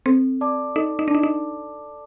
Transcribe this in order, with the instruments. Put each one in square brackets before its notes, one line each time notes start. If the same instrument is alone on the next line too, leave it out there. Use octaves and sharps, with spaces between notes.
[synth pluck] C4 [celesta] A4
[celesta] D5 A5 D6
[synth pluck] D#4 [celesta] A4
[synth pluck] D#4
D4
[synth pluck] D#4 [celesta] D5 A5 D6
[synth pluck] D#4